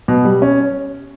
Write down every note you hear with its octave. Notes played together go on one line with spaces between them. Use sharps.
B2
G3
C#4